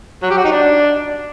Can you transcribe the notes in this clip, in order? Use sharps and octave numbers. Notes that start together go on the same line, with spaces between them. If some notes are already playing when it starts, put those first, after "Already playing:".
F#3
G4
F#4
D#4
D4